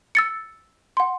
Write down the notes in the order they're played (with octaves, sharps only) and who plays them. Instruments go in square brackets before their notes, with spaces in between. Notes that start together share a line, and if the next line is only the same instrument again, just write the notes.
[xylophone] E6 A6 C#7
F#5 C6